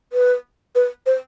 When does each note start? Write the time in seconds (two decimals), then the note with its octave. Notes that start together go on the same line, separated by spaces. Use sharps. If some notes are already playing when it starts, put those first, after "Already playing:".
0.13 B4
0.75 B4
1.06 C5